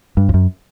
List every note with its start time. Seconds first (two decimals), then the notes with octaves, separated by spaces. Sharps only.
0.17 G2
0.29 F2
0.34 F#2